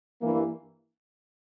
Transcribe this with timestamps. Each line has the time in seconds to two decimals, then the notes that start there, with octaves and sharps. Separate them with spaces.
0.21 G2 E3 A#3